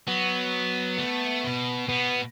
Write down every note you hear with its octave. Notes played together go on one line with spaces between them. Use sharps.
F#3 B3
A3
B2
B2 B3